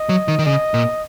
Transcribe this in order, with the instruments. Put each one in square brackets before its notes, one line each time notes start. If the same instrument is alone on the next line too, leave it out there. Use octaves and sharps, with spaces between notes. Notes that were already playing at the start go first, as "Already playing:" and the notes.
Already playing: [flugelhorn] D#5
[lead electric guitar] F#3
D#3
D#3
[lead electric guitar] C#3 [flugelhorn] D#5
[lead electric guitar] A#2